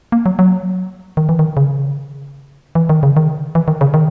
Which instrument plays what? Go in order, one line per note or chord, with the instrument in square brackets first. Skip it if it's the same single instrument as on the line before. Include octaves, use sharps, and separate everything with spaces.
[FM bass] A#3
F#3
F#3
D#3
E3
D#3
C#3
E3
D#3
C#3
D#3
E3
D#3
C#3
D#3